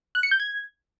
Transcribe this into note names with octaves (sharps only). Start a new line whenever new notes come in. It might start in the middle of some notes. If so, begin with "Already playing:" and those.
F#6
C#7
G6
G#6